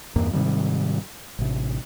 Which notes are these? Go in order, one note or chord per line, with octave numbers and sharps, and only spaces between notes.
E2 G2 A#3
G#2 C3 D#3 G3
A1 C3